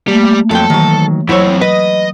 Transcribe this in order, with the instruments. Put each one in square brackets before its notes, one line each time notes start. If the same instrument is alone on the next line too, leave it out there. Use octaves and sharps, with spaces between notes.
[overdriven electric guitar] G3 [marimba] A3 A#3
[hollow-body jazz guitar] F2 F#3 G5 [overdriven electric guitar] A4
[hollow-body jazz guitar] D#3 F#3 [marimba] E3
[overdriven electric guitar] F2 C4 [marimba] F#3 E6 [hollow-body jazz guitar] E4 C#5
[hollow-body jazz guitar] B4 [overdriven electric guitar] D#5